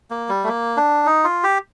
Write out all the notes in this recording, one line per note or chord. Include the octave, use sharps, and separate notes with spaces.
A#3
G3
A3
A#3
D4
D#4
F4
G4